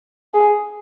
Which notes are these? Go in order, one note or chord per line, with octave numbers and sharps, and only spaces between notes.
G#4